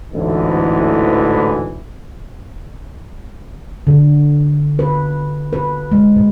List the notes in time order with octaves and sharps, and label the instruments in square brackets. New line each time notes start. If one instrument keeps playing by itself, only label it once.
[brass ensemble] A1 D2 G#2 E3
[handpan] D3
B4
B4
G#3
A#2